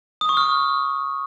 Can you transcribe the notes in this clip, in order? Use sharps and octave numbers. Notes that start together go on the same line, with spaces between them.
D#6
C#6
F6